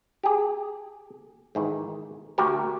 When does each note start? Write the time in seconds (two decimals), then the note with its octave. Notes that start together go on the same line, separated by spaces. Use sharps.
0.23 G4 G#4
1.55 G#2 D#3 E3
2.38 D2 F#4 G4 A#4